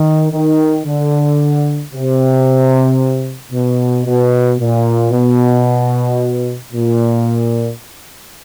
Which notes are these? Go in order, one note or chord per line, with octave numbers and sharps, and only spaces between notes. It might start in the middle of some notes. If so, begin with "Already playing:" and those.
Already playing: D#3
D#3
D3
C3
B2
B2
A#2
B2
A#2